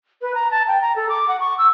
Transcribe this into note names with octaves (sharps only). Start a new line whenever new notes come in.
B4
A#5
A5
G5
A#5
A4
D6
F#5
C#6
E6